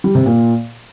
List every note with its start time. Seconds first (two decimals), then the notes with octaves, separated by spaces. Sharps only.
0.04 G3
0.15 C3
0.26 A#2